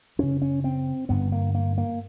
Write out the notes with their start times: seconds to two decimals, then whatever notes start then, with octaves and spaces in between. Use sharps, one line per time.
0.18 F#2 C#3 C#4
0.42 C#4
0.64 C4
1.09 G2 D3 B3
1.32 A#3
1.55 A#3
1.78 A#3